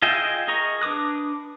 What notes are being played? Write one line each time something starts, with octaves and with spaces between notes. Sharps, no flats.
F4 G#4 D#5 E5 G5
G#4 A#4 D#5 A#5 C#6
D4 B4 D6 D#6 F#6